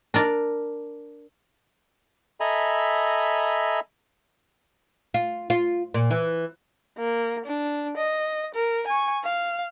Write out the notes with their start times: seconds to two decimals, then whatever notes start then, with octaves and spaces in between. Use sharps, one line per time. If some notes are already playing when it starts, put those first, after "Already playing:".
0.14 D4 A#4 D5
2.40 A4 D#5 E5 G#5 A#5 B5
5.14 F4
5.50 F4
5.94 A#2
6.11 E3
6.98 A#3
7.46 D4
7.97 D#5
8.55 A#4
8.87 G#5 C#6
9.24 F5